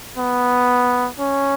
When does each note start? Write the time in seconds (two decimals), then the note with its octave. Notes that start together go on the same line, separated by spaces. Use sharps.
0.18 B3
1.19 C#4